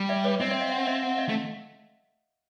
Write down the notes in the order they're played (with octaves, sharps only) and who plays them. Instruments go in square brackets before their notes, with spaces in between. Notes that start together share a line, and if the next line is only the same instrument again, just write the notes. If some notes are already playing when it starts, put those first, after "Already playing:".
Already playing: [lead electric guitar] G3
[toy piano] D5 E5
B4 C#5
[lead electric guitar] C4 [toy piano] C#5 D#5
[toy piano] D5 E5
D#5 F5
E5 F#5
D#5 F5
E5 F#5
D#5 F5
[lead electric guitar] A3